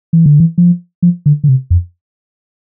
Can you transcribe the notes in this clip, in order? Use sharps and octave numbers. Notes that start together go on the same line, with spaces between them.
E3
D3
E3
F3
F3
D3
D3
C3
F2